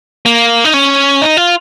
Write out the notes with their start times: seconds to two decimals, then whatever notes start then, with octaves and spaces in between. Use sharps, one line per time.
0.26 A#3
0.65 D#4
0.74 C#4
1.21 D#4
1.37 F4